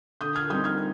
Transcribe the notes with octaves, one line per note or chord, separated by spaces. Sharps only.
D3 D#6 G6
F6 G#6
G3 C4 D#4 D#6 G6
F6 G#6